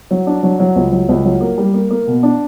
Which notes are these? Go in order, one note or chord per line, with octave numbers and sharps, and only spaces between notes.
F#3
D4
F#3
F#3
C#2
F#3
C#2
F#3
A#3
G3
A#3
A#3
B2
D4